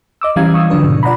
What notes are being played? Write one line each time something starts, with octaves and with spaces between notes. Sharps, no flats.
D#5 D6 E6
E3 G3 C#4 F5 A#5 G#6
C#6 D#6 E6
D3 F3 F#3 D4 B4
G#2 B2
F4 D5 F#5 A#5 B5